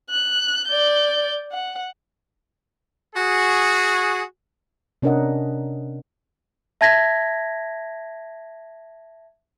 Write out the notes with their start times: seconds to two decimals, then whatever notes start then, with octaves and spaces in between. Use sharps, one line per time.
0.11 F#6
0.68 D5 G6
1.52 F#5
3.15 F#4 G#4
5.02 C3 C#4 D4 A#4 D#5 F#5
6.81 E5 A5 G#6 A#6 B6